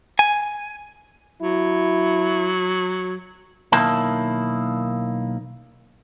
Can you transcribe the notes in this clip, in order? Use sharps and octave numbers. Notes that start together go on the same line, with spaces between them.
G#5
F#3 E4
B1 D#3 A#3 E4 A5